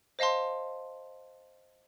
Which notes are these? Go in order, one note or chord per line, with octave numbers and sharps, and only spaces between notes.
C5 D#5 F5 A5 C6